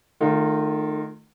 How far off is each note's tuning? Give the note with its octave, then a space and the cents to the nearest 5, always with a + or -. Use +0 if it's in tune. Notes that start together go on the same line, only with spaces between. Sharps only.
D#3 -30 A3 -5 F4 +0